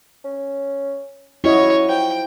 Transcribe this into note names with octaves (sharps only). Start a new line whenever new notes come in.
C#4
C#4 E4 F#4 C#5 D#5
F3 G5